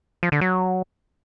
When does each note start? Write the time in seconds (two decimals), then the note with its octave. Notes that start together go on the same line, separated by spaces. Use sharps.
0.23 F3
0.32 D3
0.41 F#3